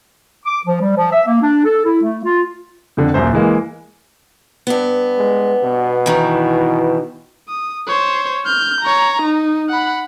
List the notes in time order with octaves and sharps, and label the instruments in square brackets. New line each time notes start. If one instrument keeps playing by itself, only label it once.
[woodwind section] D6
F3
G3
F3
E5
A#3
D4
A4
E4
A3
F4
[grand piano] F2 D3
D#1 F#2 C5
E3 G#3 A#3
[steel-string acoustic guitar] G2 B3
[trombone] G#3
B2
[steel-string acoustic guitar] D#3 E3
[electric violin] D#6
C5 C#5
F6 G6
C#5 A#5
D#4
F#5 B5